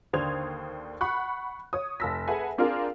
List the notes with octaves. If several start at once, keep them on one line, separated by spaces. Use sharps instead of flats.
D#2 D3 C5 D#6 G#6 F7
F#5 B5 C#6 F#6
C#5 D#6
F1 A5 E6 A#6 B6
G#4 A4 B4 E5 F#5 G#5
C4 D4 F4 G#4 A#4 F5